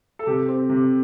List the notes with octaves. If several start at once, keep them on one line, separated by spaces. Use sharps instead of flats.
A4
C3 G4
C4
C3 G4